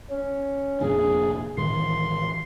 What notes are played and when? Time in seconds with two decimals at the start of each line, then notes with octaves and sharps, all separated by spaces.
0.10 C#4
0.81 F1 A#2 D4 G#4
1.57 A2 D#3 E3 C6